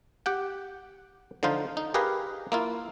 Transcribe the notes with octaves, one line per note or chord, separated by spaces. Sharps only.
G4 F#5 G5
D3 F3 D#4 F4 C5
D#4
G4 G#4 A#4 B4 F5
A#3 E4 F4